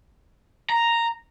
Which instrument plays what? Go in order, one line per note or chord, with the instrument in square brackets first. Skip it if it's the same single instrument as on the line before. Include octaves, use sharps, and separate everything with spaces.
[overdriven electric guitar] A#5